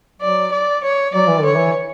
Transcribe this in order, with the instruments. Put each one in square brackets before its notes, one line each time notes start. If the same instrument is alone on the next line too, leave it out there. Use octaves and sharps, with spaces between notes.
[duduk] F#3 [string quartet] D5
[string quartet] D5
C#5
[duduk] F#3 [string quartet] D5
[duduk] E3
[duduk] D3 [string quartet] C#5
[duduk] E3